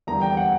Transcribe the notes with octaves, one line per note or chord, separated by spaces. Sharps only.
E2 D3 G3 A#3 A#5
G5
F#5